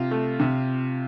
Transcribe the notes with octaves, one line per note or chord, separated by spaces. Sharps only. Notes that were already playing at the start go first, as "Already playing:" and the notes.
Already playing: C3 F4
A3
C3